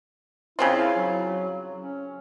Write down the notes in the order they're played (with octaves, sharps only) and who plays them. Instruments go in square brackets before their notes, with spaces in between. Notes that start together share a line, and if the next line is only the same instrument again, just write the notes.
[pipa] C#3 C4 F4 [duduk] E4
[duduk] F#3
C#4